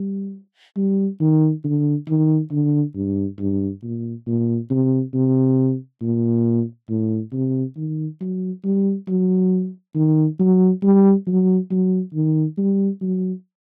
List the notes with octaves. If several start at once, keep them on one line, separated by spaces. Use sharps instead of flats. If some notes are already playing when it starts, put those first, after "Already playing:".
Already playing: G3
G3
D#3
D3
D#3
D3
G2
G2
A#2
A#2
C3
C3
A#2
A2
C3
D#3
F#3
G3
F#3
D#3
F#3
G3
F#3
F#3
D#3
G3
F#3